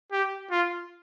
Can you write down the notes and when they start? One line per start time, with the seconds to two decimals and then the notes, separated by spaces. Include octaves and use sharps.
0.12 G4
0.51 F4